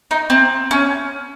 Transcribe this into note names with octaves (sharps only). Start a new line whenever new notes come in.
D#4
C4
C#4